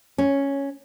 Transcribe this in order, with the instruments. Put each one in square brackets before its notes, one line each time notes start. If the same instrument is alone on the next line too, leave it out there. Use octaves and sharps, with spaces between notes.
[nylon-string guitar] C#4